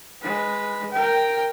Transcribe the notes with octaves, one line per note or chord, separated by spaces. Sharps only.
G#3 B4
A#4 G5